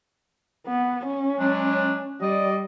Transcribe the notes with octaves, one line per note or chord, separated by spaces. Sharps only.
B3
C#4
F#3 G#3 D4
G3 D5 D#5